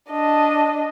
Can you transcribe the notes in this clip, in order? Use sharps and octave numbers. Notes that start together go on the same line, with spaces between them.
D4 D#5